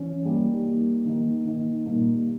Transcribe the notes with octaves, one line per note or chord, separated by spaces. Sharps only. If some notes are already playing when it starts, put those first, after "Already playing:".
Already playing: E3 C#4
G3 A#3 D#4
G3 A#3 D#4
D#3 A#3 D#4
D#3 A#3 D#4
A#2 G3 A#3 D#4